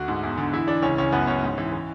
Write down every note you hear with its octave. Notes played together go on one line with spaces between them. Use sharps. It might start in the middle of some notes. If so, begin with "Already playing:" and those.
Already playing: D2 F#4
G#2
E2
D3
E3 E4
E3 D4
C#2 C#4
C#2 C#4
F#2 B3
F#2 C#4
G#2
E3
E3